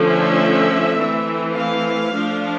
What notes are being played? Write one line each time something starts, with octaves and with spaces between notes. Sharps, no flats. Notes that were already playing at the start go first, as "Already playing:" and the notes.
Already playing: D3 F3 A3 C#4
E5
E3 A3 C4
F5
F3 A3 D4